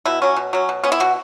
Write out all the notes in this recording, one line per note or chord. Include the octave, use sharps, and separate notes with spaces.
B2 E4
F#3 C#4
B2
F#3 C#4
B2
B3 C#4
E4
B2 F#4